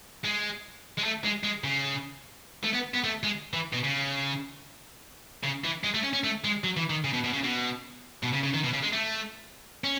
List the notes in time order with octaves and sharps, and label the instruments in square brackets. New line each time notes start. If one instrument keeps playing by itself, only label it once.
[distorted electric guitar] G#3
G#3
A3
G#3
G#3
C#3
A3
B3
B3
A3
G#3
E3
B2
C#3
C#3
E3
G#3
A3
C#4
C#4
A3
G#3
F#3
E3
D#3
C#3
B2
B2
C#3
B2
B2
C#3
C#3
D#3
B2
C#3
G#3
A3
C#4